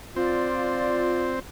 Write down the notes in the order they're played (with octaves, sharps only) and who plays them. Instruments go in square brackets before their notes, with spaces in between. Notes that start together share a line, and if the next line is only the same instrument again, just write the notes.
[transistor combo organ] C4 [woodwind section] F4 D5